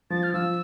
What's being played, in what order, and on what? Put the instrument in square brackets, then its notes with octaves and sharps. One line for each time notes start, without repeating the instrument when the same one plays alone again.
[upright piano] F3 [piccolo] A6
[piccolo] F6
[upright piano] F3 [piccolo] E6